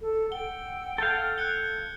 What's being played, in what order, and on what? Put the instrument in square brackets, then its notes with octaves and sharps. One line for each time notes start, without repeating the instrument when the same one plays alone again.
[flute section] A4
[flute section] F#5 G5 E6 [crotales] G7
[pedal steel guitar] A4 F5 [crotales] G6 G#6 G7
[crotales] F#6 C#7 G7